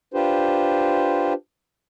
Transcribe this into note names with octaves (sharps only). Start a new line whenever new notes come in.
D4 F4 G4 B4 C5